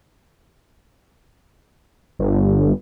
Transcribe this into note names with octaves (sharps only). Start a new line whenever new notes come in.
G1